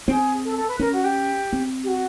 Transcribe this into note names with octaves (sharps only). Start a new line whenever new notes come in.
C4 G#4
A4
A4
B4
C#4 A#4
F#4
G4
C4
G4
F#4